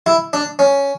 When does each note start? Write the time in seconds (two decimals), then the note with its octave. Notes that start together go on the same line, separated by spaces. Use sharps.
0.06 E4
0.33 D4
0.59 C#4